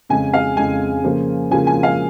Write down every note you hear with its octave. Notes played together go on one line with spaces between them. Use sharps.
F2 C#3 G#3 G#5
F5
F2 C#3 G#3 G#5
C#3 F3 A#3 F4
C#3 F3 A#3 F4 G#5
G#5
F5